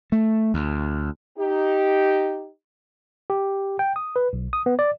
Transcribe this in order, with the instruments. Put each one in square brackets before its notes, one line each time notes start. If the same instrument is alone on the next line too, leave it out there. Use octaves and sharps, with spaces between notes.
[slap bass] A3
D2
[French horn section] D#4 G4
[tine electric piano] G4
G5
D#6
B4
B1
D#6
B3
D5